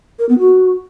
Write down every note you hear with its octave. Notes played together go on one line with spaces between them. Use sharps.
A#4
B3
F#4